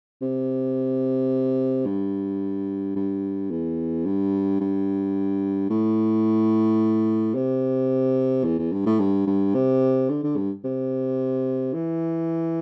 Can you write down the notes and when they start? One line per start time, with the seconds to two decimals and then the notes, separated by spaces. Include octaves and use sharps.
0.22 C3
1.86 G2
2.96 G2
3.50 E2
4.05 G2
4.60 G2
5.70 A2
7.35 C3
8.44 E2
8.59 E2
8.72 G2
8.86 A2
8.99 G2
9.27 G2
9.54 C3
10.09 D3
10.23 D3
10.36 G2
10.64 C3
11.73 E3